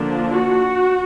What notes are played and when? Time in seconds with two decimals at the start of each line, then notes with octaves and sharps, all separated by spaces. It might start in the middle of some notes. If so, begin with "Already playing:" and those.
Already playing: D3 F3 A#3 D4
0.32 F#4